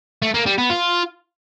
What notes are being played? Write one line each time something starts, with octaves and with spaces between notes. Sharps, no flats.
A3
A#3
G3
B3
F4